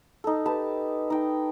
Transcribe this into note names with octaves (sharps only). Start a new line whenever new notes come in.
D#4 A4
G4 B4 A5
D#4 G5